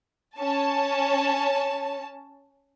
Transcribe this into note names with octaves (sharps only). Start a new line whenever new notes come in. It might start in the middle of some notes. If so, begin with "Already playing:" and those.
C#4 A5